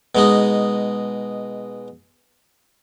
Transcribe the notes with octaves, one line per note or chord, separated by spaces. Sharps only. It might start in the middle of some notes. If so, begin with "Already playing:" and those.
B2 G#3 D#4